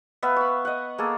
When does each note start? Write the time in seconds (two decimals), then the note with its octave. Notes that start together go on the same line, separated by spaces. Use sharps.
0.23 B3 B4 E5 F5
0.36 B5 C#6
0.65 D#5 F#5
0.98 A#3 G#4 A4